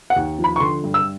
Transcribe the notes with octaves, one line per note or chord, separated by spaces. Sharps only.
F#5
D#2
F3
B5
C#6
D3 C6
G2
E6